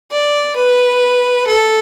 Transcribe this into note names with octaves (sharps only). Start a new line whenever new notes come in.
D5
B4
A4